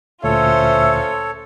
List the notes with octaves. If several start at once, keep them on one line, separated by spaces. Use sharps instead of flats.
D2 A#2 C#4 F4 A4 C5 C#5 E5